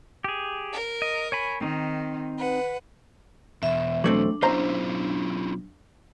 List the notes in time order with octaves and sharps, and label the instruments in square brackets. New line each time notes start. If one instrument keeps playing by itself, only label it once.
[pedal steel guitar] G4 G#4
[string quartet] A#4
[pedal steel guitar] D#5
C#5 G#5 B5
[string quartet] D#3 [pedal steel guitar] C4 D#4
[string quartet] B4 F#5
[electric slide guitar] E2 B2 [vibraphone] E5
[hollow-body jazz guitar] F#3 A3 C4 [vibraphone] D4
[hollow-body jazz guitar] B1 C5 A#5 [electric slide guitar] C#4 E4 F4